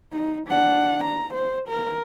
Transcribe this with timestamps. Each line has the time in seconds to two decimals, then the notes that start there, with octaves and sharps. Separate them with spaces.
0.12 D#4
0.47 D4 F#5
1.05 A#5
1.34 C5
1.69 A#4